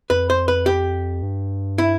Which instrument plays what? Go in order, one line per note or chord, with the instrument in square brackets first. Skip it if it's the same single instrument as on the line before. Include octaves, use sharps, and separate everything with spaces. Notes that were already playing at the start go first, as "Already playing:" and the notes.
[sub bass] F2 [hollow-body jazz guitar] B4
[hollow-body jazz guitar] C5
B4
G4
[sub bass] G2
[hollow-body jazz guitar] E4